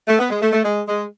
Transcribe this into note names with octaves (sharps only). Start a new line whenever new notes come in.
A3
B3
G#3
A3
A3
G#3
G#3